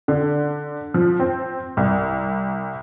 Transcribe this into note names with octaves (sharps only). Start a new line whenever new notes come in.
D3
F3
C4
C2